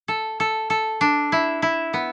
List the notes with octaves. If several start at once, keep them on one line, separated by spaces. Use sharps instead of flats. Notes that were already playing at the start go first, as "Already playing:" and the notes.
A4
A4
A4
D4
E4
E4
B3